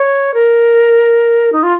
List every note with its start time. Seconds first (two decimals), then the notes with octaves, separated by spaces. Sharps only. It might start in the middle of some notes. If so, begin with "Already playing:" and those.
Already playing: C#5
0.34 A#4
1.53 D#4
1.63 F4